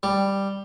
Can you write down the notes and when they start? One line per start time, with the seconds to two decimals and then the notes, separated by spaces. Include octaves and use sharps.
0.03 G3